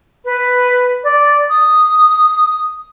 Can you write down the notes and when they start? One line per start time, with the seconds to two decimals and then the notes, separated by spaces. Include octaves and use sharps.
0.25 B4
1.04 D5
1.50 D#6